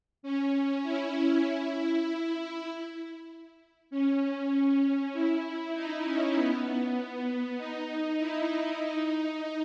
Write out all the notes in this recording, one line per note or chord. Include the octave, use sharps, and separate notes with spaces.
C#4
E4
E4
E4
C#4
E4
D#4
C#4
B3
B3
D#4
E4
D#4
D#4